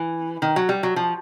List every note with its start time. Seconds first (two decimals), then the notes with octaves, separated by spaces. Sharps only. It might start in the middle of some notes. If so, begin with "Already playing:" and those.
Already playing: E3
0.42 D#3
0.56 F#3
0.69 G3
0.83 F#3
0.96 F3